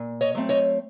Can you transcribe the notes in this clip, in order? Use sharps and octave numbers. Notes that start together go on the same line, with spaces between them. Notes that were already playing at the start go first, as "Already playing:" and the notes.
Already playing: A#2
C#5 D#5
F#3 A3 C4
C#5 D#5